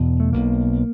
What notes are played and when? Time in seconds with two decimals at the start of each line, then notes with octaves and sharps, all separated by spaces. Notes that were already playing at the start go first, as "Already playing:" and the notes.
Already playing: E1 E2 B2
0.20 A3
0.33 B1 B2 A#3